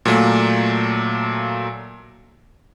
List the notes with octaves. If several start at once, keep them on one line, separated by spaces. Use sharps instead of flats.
A#2 F#3 A3 A#3